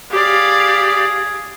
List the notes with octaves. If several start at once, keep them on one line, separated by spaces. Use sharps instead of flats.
G4 G#4 D5 F5